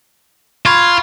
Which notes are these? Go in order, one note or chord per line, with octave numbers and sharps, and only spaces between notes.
F4 B5 C#6 G#6